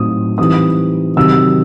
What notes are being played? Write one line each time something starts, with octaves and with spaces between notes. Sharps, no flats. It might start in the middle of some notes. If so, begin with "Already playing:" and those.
Already playing: A2 F#3 C4 D#4 D#6
E3 G3 C4 D#4 D#6
C3 D#3 F#3 C4 E6